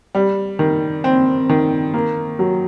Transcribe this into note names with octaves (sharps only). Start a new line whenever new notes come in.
G3
D#3
C4
D#3
A#3
F#3